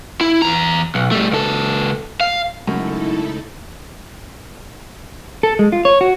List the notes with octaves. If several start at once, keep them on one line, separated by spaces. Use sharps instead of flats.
E4
E2 A#5
B1
G3 A3
C#2 A4
F5
F#2 C#3 G#3 A3 D#4 E4 A4
A4
G#3
F4
C#5
F#4